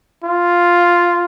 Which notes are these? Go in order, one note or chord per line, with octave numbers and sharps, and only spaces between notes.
F4